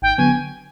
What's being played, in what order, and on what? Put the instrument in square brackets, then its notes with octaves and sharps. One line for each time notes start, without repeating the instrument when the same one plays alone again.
[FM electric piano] G#1 [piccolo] G5
[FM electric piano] D3 F#3 B3 [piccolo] G#5